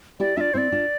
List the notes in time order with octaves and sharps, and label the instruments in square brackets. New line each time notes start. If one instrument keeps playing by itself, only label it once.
[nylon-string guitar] E4 G4 [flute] D5
[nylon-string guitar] D4 F4 [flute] D5 E5
[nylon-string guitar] C4 E4 [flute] C5 D5
[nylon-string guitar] D4 F4